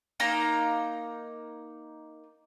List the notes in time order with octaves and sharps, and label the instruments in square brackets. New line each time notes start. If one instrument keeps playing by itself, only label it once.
[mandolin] A#3 D#4 A#5